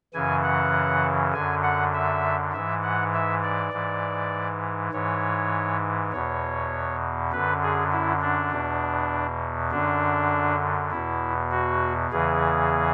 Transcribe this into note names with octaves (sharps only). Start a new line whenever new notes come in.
F#2 C#3 E3 G#5
F#5
F#2 D3 G#5
F#5
E5
G#2 E3 E5
F#5
E5
D5
G#2 E3
G#2 E3 C#5
E2 B2 C#5
F#2 D3 B4
G#4
E4
D4
E2 B2
F#2 D3 D4
E2 B2 E4
F#4
E2 C#3 E3 G#4